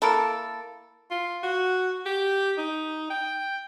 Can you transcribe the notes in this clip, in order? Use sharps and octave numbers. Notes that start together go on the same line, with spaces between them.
A#3 E4 A4
F4
F#4
G4
D#4
G5